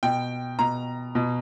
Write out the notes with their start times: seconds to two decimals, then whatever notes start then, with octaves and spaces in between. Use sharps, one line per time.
0.03 B2 G5
0.59 B2 A#5
1.15 B2